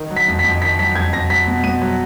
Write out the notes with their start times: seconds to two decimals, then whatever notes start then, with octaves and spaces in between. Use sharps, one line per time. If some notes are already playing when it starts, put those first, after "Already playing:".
Already playing: D#3
0.11 F#3
0.17 B6
0.28 F2
0.39 B6
0.44 F2
0.62 D#3 B6
0.79 F#3 B6
0.95 F2 G#6
1.13 F2 A#6
1.30 F#3 B6
1.47 B2
1.64 B2 D#7
1.82 F#3